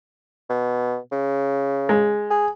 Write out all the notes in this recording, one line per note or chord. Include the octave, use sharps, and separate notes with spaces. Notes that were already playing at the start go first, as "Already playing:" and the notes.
B2
C#3
G#3
G#4